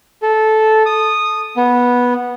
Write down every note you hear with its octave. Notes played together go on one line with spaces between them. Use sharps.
A4
D#6
B3